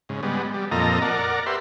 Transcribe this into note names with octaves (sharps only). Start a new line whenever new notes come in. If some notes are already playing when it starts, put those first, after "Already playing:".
G#2 C#3
G3 G#3 B3
G3
F2 A#2 A4 D#5 A#5
A#4 D5 F#5
G4 B4 E5 C6